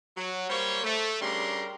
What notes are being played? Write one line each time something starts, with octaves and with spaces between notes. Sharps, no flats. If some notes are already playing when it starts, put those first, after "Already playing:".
F#3
G3 A#3 C5 C#5
A3
C#3 G3 D4 A#4 C6